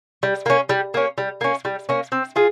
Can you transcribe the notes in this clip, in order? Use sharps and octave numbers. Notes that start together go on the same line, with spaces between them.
G3
A#3 C#4
G3
A#3 C#4
G3
A#3 C#4
G3
A#3 C#4
C4
F4 G#4